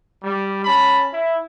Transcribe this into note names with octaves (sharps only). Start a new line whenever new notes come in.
G3
C#4 A5 B5
E4